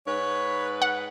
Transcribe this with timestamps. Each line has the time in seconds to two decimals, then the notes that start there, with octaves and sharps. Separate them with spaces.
0.07 G#2 B4 C#5
0.82 F#5